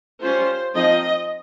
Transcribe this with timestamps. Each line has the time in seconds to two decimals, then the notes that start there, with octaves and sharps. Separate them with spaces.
0.22 G3 C#4 F4 C5
0.74 F3 C4 D#4 D#5